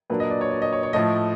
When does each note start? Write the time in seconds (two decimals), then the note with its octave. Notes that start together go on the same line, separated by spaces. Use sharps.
0.10 A#2 F#3 A#3 D4 B4
0.20 D#5
0.30 D5
0.41 C#5
0.51 D5
0.62 D#5
0.73 C#5
0.83 C#5
0.93 A2 F3 A3 D#5